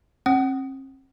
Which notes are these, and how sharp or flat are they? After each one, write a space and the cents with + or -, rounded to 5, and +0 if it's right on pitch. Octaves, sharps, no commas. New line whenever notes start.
C4 +45 F#5 +30 D#6 +0